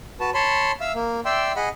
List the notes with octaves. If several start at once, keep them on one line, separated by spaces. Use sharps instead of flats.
F#4 B4 A5
C#5 A5 B5 C6
E5 F5 E6
A#3
D5 E5 G5 C6 E6
G#4 D#5 F#5 B5